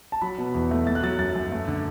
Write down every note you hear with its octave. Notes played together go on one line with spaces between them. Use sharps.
A5
F#3 B5
B2
E2
A3
A3 A6
F#6
F#3 A6
F#2 A6
F#2
A3
D3